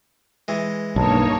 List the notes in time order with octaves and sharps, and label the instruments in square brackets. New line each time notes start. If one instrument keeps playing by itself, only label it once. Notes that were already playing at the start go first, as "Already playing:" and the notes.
[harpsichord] E3 G#3
[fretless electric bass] B1 [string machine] G2 A#3 C#5 [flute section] D#4 A5